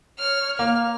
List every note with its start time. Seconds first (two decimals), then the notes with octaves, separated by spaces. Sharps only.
0.19 C#5 F6
0.59 A#3 F6